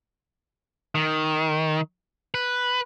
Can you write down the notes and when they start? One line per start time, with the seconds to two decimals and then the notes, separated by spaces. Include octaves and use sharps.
0.95 D#3
2.34 B4